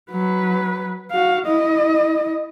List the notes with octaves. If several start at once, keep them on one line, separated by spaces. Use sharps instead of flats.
F#3 B4
F#4 F5
E4 D#5